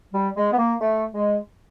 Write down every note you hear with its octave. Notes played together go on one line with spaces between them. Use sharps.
G3
G#3
B3
A#3
A3
G#3